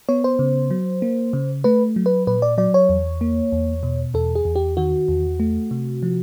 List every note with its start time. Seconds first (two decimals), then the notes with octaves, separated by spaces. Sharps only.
0.09 B3 C#5
0.24 C5
0.39 C#3
0.71 F#3
1.02 A#3
1.33 C#3
1.64 A3 B4
1.96 F#3
2.06 B4
2.27 A#2 B4
2.42 D5
2.58 F#3 D5
2.74 C#5
2.89 E2
3.21 A#3
3.52 E2
3.83 B2
4.14 E2 A4
4.35 G#4
4.45 E2
4.56 G4
4.77 D#3 F#4
5.08 E2
5.40 A3
5.71 C3
6.03 F3